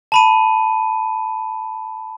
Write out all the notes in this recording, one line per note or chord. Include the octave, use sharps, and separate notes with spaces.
A5 B5 D#7